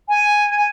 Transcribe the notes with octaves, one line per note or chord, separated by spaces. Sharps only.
G#5